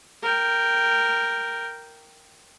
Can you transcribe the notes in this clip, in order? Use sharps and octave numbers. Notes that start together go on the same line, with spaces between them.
A#4 G5